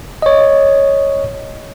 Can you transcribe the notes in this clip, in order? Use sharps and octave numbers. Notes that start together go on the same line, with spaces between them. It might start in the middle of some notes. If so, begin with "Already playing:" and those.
C#5 D#5